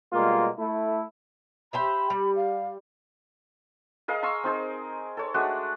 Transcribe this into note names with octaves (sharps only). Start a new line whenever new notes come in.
B2 G3 G#3 A#3 F4
A3 E4
G4 C5 E5 B5
G3
F5
G#4 A#4 D#5 F5
A#5 C6 C#6 E6
C4 D#4 G#4
A4 C#5
G#3 A3 D4 F#4